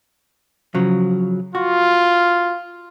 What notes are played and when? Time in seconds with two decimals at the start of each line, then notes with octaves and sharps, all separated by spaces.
0.75 C#3 F3 F#3
1.55 F4 F#4